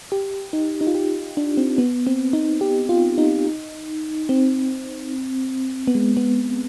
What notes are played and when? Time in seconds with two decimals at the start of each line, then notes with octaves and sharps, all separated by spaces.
0.12 G4
0.53 D#4
0.81 D#4
0.87 F4
0.95 G4
1.37 D4
1.58 C4
1.78 B3
2.07 C4
2.33 D#4
2.61 G4
2.89 F4
3.18 D#4
4.29 C4
5.87 B3
5.95 G#3
6.17 B3